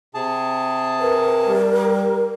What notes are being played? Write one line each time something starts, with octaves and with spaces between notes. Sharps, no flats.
C3 G#4 A5
A#4 B4
G3